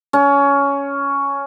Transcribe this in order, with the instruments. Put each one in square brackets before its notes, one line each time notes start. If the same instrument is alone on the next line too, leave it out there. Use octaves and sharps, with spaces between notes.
[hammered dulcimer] C#4